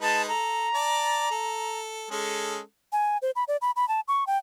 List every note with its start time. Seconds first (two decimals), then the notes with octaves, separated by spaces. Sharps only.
0.01 G#3 D#4 B4 A5
0.28 A4 A#5
0.74 D5 A5
1.31 A4
2.11 G#3 C#4 A4
2.92 G#5
3.22 C5
3.36 B5
3.48 D5
3.62 B5
3.76 B5
3.88 A5
4.08 C#6
4.27 G5